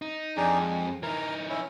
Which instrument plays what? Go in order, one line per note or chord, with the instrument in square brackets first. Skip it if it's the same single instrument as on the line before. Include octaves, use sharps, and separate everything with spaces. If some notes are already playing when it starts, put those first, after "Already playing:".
[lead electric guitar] D#4
[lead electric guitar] F2 [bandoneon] D4 D#4 G#4
[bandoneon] G#3
[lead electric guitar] E3 D#4 [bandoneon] A#4
[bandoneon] C#4 E4